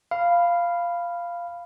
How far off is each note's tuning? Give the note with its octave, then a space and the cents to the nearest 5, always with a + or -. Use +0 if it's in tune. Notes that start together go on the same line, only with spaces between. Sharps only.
F5 -10 B5 +0